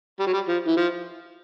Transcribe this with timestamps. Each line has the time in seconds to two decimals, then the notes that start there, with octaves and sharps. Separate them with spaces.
0.19 G3
0.27 F#3
0.33 G3
0.48 F3
0.68 E3
0.77 F3